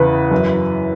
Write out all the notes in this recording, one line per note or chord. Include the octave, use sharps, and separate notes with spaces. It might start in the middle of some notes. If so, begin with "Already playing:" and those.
Already playing: E2 C#3 E3 B4
F#2 E3